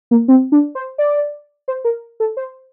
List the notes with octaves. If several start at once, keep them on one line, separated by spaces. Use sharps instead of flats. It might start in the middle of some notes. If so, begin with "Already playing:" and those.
A#3
C4
D4
C5
D5
C5
A#4
A4
C5